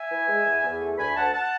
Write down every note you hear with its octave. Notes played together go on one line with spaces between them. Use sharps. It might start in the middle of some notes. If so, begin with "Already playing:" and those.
Already playing: E5 G#5
E3
G#3
E2
E2
A3
D2 G#5 B5
D2 F#5 A5
F#5 A5